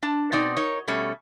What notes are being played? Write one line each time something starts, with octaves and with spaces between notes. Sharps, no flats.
D4 A5
B2 C4 D#4 D5
D#4 A#4 C#5
B2 G3 A3 C#4